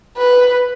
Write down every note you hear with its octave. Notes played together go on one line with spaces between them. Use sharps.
B4